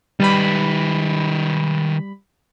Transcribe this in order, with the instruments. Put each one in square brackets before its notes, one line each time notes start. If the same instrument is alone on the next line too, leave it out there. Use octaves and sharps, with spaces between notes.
[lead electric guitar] D#3 B4 [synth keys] G3 B5